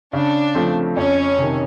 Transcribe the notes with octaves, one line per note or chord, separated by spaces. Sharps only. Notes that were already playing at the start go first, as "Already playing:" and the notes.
C#3 D4
F3 A3 C4
F2 C#4
C3 D#3